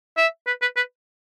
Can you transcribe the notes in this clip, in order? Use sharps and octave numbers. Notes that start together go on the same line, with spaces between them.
E5
B4
B4
B4